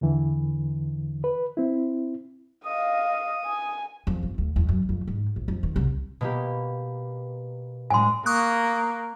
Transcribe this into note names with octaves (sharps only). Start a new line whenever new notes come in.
E2 D3 E3
B4
C4 E4
D#5 F5 D#6
G#5
F2
G1
D2
E2
F#2
F2
G#2
A#1
F2
D#3
C2
B2 A#3 G4
A2 G#3 G#5 C6
A#3 C#6 D#6 F#6